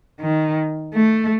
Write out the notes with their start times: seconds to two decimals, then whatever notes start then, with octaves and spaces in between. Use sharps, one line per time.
0.20 D#3
0.94 A3